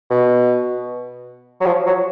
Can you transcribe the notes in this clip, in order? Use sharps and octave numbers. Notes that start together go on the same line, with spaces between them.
B2
F#3
F3
F#3